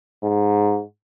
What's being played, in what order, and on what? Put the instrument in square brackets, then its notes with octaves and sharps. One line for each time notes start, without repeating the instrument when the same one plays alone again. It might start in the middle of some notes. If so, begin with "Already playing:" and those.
[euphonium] G#2